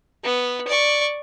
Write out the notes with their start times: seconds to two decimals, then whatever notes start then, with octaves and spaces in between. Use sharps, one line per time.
0.24 B3
0.68 D5 C#6